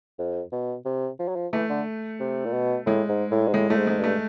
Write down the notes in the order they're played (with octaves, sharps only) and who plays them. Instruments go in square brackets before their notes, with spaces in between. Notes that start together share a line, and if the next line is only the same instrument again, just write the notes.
[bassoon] F2
B2
C3
F3
F#3
F3
[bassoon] E3 [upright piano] A3
[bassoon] D3
C3
A#2
B2
[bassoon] A2 [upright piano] G#3
[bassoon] G#2
A2
G#2
[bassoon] A2 [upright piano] G#3
[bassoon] A2 [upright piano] A3
[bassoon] G#2
[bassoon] G#2 [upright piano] G#3
[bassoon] G2
[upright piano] A3